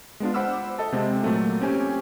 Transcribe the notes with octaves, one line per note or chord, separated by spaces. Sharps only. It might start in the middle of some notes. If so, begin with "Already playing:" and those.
G#3 B3 D4 F4
C5 F#5 B5 D6 E6 F6
A4 D#5 E5 A5
C3 G#3 C4
A#2 F#3 A3 A#3
C4 C#4 G4 G#5